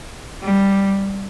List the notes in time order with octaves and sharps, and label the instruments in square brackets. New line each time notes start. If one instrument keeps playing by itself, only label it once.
[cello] G3